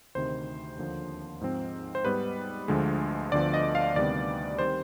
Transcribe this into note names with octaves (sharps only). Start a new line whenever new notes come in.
D2 C3 D#3 C5
D#2 D3 F3
G#2 F3 C4
C5
G#2 G3 B3 B4
D2 D3 F3 G#3
D2 D3 F3 B3 D5
D#5
F5
D2 C3 D#3 G3 B3 D5
D#3 G3 C4 C5